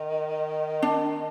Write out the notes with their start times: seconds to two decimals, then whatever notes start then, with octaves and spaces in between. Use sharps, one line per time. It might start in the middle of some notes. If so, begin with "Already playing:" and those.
Already playing: D#3
0.82 D4